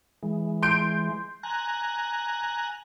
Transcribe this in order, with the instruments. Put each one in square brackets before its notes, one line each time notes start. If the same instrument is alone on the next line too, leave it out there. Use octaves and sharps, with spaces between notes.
[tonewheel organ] E3 G#3
[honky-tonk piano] C6 G6 D7
[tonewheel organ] G#5 A#5 F#6